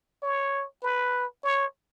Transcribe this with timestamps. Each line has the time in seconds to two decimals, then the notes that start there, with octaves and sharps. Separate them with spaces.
0.23 C#5
0.83 B4
1.44 C#5